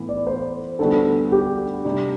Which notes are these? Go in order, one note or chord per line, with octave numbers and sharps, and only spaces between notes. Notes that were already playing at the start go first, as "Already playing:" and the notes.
Already playing: A2 E3 B3 E4
D5
C5
D2 D3 G3 B3 F#4 A4
G4
C3 G3 D4